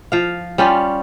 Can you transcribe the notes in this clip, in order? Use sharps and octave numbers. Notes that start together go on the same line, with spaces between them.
F3 F5
G3 C#4 F4 G4